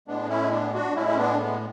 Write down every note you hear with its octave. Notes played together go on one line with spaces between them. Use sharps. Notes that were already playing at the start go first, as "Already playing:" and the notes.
A2 G#3 B3 D4
C#4 E4
B3 D4
D4 F#4
A2 G#3 C#4 E4
C#4
B3 D4
G#3 B3